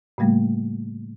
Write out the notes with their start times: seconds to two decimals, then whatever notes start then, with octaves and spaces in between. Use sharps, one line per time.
0.18 A2 C#3 G3 A3 A#3